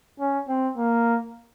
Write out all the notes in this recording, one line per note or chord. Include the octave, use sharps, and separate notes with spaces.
C#4
C4
A#3